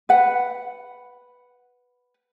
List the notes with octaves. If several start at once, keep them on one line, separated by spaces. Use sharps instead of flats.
B4 F#5